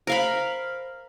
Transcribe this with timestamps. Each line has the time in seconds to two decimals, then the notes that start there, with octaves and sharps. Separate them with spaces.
0.07 A#4 C5 F5 B5